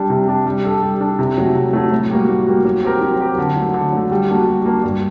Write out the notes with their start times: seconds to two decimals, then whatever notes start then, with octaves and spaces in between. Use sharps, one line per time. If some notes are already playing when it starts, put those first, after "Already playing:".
Already playing: G3 D4
0.10 C3
0.28 G3 D4
0.46 G3
0.64 D4 A4
0.82 G3
1.01 D4 A4
1.19 C3
1.37 F#3 A3
1.55 C3
1.73 F#3 A3
1.92 A2
2.10 G3 A#3 F#4
2.29 A2
2.47 G3 A#3 F#4
2.65 F#3
2.83 C4 G4 A#4
3.02 F#3
3.19 C4 G4 A#4
3.38 D3
3.56 F#3 A3
3.74 D3
3.92 F#3 A3
4.11 G3
4.29 A#3 D4 F#4
4.47 G3
4.66 A#3 D4 F#4
4.84 G2